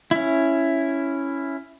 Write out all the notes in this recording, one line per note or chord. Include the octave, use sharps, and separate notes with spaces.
C#4 E4